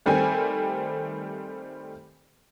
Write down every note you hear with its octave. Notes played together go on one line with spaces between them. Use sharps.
D#3 G3 A3 C4 G#5